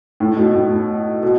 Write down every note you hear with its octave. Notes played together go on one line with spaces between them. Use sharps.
A2
B2
A2
B2